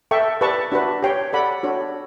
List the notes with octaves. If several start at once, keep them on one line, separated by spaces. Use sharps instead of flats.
A4 E5 G5 C#6
G4 B4 D5 A5 C#6
D4 F#4 B4
G4 C#5 G5
A4 D5 F#5 B5
D4 F#4 A4 C#5